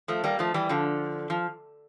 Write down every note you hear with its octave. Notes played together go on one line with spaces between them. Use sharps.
F3 A3
G3 A#3
F3 A3
E3 G3
D3 F3
F3